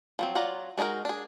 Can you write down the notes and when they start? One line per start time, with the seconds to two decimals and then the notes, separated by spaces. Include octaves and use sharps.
0.19 F3 F#3 C4
0.35 F#3 F4 D5 F#5 A#5
0.78 G#3 D4 D#4 F#4 A#4
1.05 D4 G#4